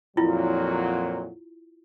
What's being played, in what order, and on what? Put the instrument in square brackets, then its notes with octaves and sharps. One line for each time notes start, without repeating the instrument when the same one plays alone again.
[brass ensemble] F2 A#2 F#3 [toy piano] E4 F4